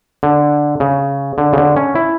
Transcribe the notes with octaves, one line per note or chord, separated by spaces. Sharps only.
D3
C#3
D3
C#3
D3
C#4
E4